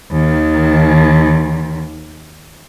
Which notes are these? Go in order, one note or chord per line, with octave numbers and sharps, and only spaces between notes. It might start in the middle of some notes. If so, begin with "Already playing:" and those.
D#2 D#3